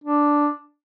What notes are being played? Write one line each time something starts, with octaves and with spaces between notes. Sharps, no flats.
D4